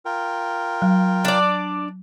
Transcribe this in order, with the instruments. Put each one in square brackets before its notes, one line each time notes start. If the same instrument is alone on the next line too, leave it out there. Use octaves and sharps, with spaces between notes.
[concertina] F4 A#4 G5
[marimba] F#3
[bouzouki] D4 D5